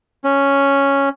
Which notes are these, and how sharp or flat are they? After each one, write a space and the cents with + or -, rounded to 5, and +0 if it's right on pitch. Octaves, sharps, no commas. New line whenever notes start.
C#4 +0